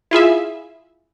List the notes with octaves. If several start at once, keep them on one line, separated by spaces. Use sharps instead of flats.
E4 F4 G#4 E5